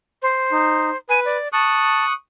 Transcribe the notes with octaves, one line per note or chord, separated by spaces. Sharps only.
C5
D#4
B4 G#5
D5
A5 C#6 D#6 F#6